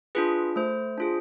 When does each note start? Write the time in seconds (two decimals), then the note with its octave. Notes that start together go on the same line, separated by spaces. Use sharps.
0.15 D4 F4 G#4 B4
0.56 A3 C5
0.98 D4 F4 G#4